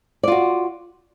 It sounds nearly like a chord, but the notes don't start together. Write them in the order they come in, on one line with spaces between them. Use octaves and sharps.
D5 F4 F#4